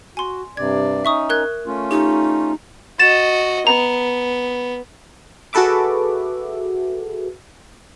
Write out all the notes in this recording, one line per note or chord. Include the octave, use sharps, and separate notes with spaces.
F#4 G#5 C6
G2 C3 D5 G#6
C#4 D#4 E5 C#6 D#6
A#4 F#6 G#6
A3 C#4 F4
D#4 G4
F#4 D#5 A6 E7
B3 A#5
F#4 G#4 A4 B4 E5 D6